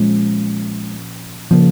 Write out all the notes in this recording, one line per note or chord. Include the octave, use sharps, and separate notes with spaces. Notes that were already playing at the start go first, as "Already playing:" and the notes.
Already playing: A#2 F3 G#3 C#4
C#3 F3 A#3 C#4 F4